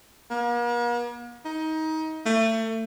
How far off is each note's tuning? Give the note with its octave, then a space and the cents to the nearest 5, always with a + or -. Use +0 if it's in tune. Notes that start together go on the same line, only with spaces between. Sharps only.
A#3 +45
D#4 +25
A3 +30